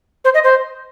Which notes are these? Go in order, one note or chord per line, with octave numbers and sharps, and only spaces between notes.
C5
D#5
C5